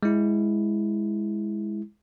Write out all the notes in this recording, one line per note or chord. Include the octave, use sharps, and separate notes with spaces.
G#3 E4